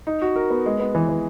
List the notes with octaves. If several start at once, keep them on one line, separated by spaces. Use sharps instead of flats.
D#4
F#4
A#4
B3
G#3
B3
E3
E3